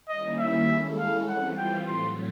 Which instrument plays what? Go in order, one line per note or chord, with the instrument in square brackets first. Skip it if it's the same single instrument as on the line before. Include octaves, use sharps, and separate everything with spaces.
[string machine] D#3 G3 A#3 C#4 E4 [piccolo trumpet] D#5
[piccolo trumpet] E5
[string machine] G#3 C#4 E4 A4
[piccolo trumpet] F5
[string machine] E3 G3 C4 F4 [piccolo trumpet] F#5
[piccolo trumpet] G5
[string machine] A2 F#3 A3 [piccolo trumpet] C6